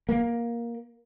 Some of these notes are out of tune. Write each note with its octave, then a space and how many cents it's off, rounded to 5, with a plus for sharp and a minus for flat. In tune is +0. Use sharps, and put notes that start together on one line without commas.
A#3 +10